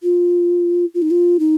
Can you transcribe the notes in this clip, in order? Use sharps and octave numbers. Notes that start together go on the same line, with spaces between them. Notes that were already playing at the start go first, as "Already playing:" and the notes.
F4
F4
D#4
F4
D#4